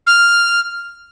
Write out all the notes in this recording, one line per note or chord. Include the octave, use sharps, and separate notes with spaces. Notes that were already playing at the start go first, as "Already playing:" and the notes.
F6